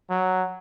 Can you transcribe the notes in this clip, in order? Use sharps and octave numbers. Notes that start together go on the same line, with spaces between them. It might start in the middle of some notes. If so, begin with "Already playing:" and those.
F#3